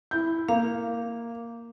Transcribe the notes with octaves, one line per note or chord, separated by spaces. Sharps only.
E4 G6
A#3 F5